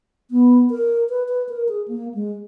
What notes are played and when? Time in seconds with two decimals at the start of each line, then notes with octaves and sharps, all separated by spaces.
0.31 B3
0.70 A#4
1.09 B4
1.29 B4
1.49 A#4
1.69 G#4
1.88 A#3
2.14 G#3